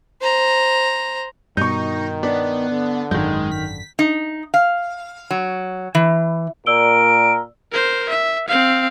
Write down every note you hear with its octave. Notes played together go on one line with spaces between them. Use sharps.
C5 A#5
G2 B2 D#3 D#4 C#6 G6
B3 D4
D3
G#1 F#2 D#3 G#3 G6
D3 B6
D#4
F5
F#3
E3
A#2 A#4 D5 E6 D7 G7
A#4 C5
E5
C4 F5